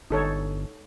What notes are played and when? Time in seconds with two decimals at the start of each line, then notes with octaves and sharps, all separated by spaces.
0.10 G1 D#4 A4 C#5